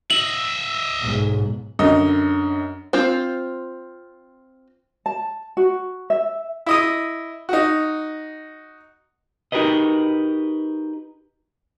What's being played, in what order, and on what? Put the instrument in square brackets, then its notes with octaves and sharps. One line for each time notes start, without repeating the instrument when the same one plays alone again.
[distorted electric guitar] D#5 E5 [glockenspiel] F#7
[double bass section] B1 G#2
[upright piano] F#2 D3 D#5
[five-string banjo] C4 F4 C5
[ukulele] A5
F#4
E5
[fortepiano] E4 D#5 D#6
D#4 F#4
[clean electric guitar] D#4 F#4 G4 A#4 B4 D#5